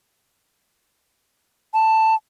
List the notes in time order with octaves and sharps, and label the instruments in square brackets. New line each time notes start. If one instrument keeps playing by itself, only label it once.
[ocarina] A5